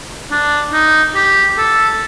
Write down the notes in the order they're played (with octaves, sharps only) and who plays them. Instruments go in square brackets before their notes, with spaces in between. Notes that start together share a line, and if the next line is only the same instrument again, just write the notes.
[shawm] D4
D#4
G4
A4